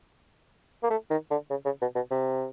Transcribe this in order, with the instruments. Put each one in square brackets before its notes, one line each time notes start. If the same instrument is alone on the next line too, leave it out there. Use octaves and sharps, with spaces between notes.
[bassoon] A#3
A3
D#3
D3
C#3
C#3
B2
B2
C3